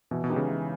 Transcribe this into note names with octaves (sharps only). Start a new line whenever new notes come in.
B2 E3
B2
G#3 B3 D#4 G4
C#3
E3